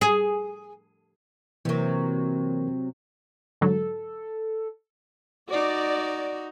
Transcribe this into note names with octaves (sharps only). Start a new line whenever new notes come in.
G#4
C3 E3 F#3 A#3 A#4
G#2 D3 F#3 A4
D#4 F#4 D5